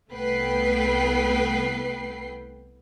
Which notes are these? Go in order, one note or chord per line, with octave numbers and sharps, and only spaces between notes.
C2 A3 B3 B4 G5 C7